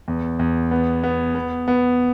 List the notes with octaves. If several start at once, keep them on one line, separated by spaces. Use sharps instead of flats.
E2
E2
B3
B3
B3
B3